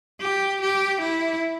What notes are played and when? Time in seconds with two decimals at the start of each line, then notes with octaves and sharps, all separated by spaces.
0.21 G4
0.62 G4
1.01 E4